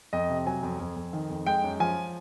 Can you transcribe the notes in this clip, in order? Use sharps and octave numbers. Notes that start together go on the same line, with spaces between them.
F2 D#5
C3
F#3 G#5
F2
F2
F2
D#3
F2
G#3 G5
F#2
F3 G#5